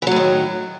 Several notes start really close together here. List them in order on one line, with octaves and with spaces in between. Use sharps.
E3 F#3 A2 D#3